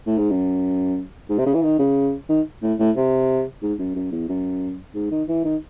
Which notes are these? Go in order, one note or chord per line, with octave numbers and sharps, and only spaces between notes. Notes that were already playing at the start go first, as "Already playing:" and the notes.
A2
G#2
F#2
G#2
C3
C#3
E3
D#3
C#3
D#3
A2
A2
C3
G#2
F#2
F#2
E2
F#2
G#2
D#3
E3
D#3